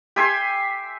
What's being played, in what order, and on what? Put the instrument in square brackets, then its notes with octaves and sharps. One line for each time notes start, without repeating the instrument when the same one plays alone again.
[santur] G4 E5 G#5 C6